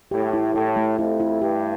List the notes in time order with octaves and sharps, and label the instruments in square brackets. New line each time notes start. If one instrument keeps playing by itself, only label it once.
[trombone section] A2 [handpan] G4
[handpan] E4
[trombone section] A2 [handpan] E4
[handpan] A3
[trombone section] F2 [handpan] E4
[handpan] E4
[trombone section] G2 [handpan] G4